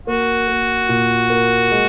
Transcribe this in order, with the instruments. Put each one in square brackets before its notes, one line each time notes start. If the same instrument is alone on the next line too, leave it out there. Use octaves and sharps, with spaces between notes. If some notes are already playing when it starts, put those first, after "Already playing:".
[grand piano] A#3 [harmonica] F#4
[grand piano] A#3
A#2
A#3
G#3